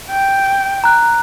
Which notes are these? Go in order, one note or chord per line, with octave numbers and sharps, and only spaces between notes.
G5
A#5 F#6